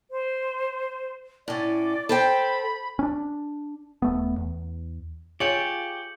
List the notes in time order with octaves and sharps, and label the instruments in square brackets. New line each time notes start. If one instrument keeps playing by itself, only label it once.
[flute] C5
[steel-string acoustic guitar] A2 C#4 [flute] D5
[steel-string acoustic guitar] A4 C5 G5 [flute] B5
[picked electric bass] C#4 D4
D#1 A3 B3
E2
[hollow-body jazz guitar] F4 G#4 [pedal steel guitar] G4 [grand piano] C#5 D7 [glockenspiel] G6 C#7 F#7